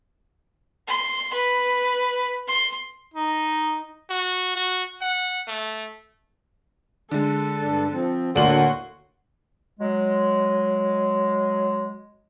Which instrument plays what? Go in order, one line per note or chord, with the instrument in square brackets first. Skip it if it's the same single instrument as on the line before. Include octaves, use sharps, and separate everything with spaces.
[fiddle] C6
B4
C6
[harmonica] D#4
[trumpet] F#4
F#4
F#5
A3
[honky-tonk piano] D3 G#3 [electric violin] A4
[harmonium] G2 D4
F3 C4
[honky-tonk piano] D2 F#7 [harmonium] A2 A#3 F#5 [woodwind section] D3 [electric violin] F#4 C6
[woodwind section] F#3 G#3